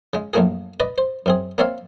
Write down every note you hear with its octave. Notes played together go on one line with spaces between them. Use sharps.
C#3 G#3
A#1 F#2 A3 A#3 F#4 G#4
B4 D5 D#5
C5
F#2 C4 G#4
A#3 C4 C#5 D5 E5 F5